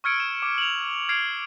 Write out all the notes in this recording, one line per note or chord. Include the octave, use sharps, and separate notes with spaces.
C#6 E6 F6 G#6 C#7 D7
E7
D6
F7 F#7
F6 G#6 C7 D7 F7